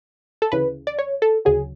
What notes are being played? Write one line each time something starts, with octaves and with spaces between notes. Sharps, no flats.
A4
D2 C#3 E3 B4
D5
C#5
A4
D2 C#3 F#3 G#4